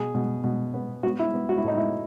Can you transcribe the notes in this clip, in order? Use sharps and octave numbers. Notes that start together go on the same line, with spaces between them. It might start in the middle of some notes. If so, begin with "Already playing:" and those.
Already playing: B2 G#4
B2
B2
B3
B3 F#4
E4
B3
F#4
E4
A2 D#4
E4